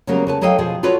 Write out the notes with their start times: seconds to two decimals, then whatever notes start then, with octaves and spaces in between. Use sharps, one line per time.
0.07 C#3 F#3 G3 A#3 B3 A#4
0.27 C#3 B4 A5
0.41 F#3 E4 A4 D#5 F5 G5
0.58 B2 F3 G#4
0.83 F4 F#4 A4 B4 C#5 D5